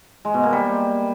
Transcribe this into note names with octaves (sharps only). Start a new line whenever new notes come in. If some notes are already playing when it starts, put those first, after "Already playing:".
G#3
B2
A#3
G3